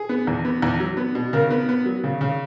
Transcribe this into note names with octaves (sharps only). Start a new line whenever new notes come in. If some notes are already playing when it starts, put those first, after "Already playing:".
Already playing: G#4
B3
E2
B3
E2
F#3
B3
B2
C#3 A#4
B3
B3
F#3
C#3
C#3